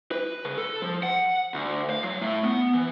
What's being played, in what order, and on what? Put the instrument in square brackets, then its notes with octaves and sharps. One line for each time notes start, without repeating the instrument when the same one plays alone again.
[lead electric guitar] B4
C#3
A4
F3
F#5
D2
F5
F#3
A2
B3
E3